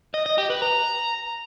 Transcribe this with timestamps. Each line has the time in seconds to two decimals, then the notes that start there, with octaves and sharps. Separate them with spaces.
0.14 D#5
0.26 D#5
0.38 G4
0.50 B4
0.62 A#5